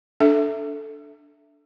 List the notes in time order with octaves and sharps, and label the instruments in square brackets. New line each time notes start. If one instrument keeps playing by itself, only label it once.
[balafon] D4 A4 E5